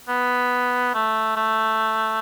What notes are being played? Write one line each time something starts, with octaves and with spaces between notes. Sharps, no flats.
B3
A3
A3